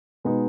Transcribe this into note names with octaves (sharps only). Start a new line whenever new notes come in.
B2 G#3 B3 D#4